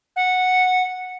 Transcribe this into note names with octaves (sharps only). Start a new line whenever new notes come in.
F#5